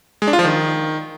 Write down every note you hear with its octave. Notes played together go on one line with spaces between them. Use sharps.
G#3
D4
F4
F3
D#3